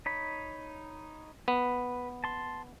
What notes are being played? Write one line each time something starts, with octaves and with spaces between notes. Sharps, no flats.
D#4 C#5 B5
B3 B4
A5 C6